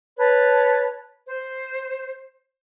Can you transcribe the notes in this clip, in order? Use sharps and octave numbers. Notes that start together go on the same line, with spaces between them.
B4 C#5 A5
C5